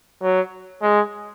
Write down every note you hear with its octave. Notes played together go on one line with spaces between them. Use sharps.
F#3
G#3